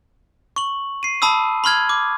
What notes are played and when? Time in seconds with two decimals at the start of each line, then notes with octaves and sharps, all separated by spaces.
0.56 C#6 F#7
1.03 C7 D#7
1.22 A5 B5 D#6 E6
1.64 B5 C6 F6 G#6
1.89 D6